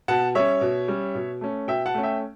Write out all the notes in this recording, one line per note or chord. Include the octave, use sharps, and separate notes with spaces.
B2 F#5 A5
G3 C#4 C#5 E5
B2
G3 C#4
B2
A3 C#4
B2 E5 G5
F#5 A5
A3 C#4
E5 G5